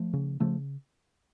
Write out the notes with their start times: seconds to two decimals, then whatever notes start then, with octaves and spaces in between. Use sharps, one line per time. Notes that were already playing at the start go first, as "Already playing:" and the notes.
Already playing: F3 A3
0.13 C#3
0.40 C#3 F3 A3